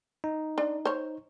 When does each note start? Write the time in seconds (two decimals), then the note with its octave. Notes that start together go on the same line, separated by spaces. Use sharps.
0.24 D#4
0.58 D4
0.85 C5 C#5